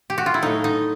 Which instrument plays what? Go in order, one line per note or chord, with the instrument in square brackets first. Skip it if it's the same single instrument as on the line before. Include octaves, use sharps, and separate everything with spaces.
[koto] G4
F#4
F4
E4
A2 F#3 A3 D#4
D#4